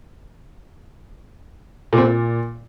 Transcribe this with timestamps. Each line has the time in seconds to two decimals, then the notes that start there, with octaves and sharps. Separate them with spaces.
1.93 A#2
1.98 C4
2.03 A#2